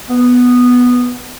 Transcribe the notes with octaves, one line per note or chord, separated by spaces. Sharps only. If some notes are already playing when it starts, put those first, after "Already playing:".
B3